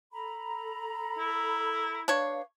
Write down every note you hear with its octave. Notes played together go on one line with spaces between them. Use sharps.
A4 A#5 B5
E4
D4 B4 C#5 F5